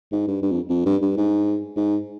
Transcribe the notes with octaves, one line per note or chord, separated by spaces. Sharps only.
G#2
G2
G2
F2
F2
G2
G2
G#2
G#2